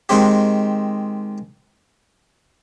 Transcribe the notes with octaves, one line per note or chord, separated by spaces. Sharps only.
D#3 G#3 C4 G4